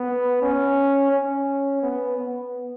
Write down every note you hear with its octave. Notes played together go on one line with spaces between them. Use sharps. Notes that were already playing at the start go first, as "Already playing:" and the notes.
Already playing: B3
C#4
C#4
B3
B3